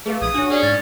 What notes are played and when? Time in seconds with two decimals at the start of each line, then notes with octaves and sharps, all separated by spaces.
0.06 A3 G#4 B4 F5
0.22 A#1 D#6 G#6
0.34 D4 F#4 C#5 G#5
0.50 C#4 G#4 D5
0.63 G#2 A6